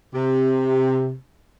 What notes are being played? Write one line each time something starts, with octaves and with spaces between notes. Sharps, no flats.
C3